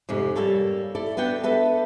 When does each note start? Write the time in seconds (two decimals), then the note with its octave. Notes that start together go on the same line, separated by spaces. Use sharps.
0.09 F2 G#2 C3
0.35 G3 A#3 A4 C#5
0.95 E4 A4 D5
1.17 B3 D4 F#4 G5
1.43 A4 B4 E5 A5